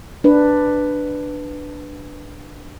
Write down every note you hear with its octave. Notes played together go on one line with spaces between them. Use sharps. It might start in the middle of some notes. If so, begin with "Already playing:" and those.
D4 B4